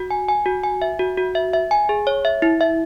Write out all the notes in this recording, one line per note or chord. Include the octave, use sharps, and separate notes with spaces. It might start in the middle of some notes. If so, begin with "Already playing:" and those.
Already playing: F#4
G#5
G#5
F#4
G#5
E5
F#4
F#4
E5
E5
G#5
G#4
C#5
E5
E4
E5